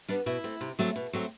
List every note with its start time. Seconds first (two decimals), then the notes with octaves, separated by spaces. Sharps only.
0.08 G3 B3 D4
0.26 B2 E4
0.44 A3 C4
0.61 C3
0.79 F#3 A3 C4
0.96 B2
1.13 F#3 A3 C4